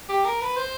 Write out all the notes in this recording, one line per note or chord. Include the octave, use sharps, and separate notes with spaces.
G4
A#4
B4
C5